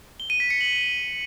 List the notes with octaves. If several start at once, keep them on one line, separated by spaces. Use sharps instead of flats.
G7
D#7
B6
C#7
F#7